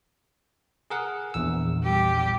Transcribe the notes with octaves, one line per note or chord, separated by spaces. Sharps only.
G#4 A#4 F#5
A#1 E2 E6
G3 G4